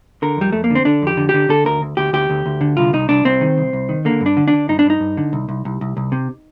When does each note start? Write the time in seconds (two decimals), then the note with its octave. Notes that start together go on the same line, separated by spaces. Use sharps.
0.22 D3 A#4
0.37 F2 G3
0.52 F2 A3
0.64 A#3
0.70 D3 C4
0.85 D3 D4
1.02 F2 G4
1.17 D3
1.29 G4
1.34 D3
1.49 D3 A4
1.65 D2 A#4
1.82 D2
1.97 D2 G4
2.13 D2 G4
2.30 D2
2.46 D2
2.61 D3
2.77 C2 F4
2.93 C2 D#4
3.09 C2 D4
3.25 C2 C4
3.41 D#3
3.58 C2
3.73 C2
3.89 D#3
4.05 D3 A#3
4.21 G2
4.26 D4
4.37 D3
4.48 D4
4.54 D3
4.69 G2 D#4
4.79 D4
4.85 G2 D#4
5.00 G2
5.17 D3
5.33 C2
5.49 C2
5.65 C2
5.81 C2
5.97 C2
6.12 C3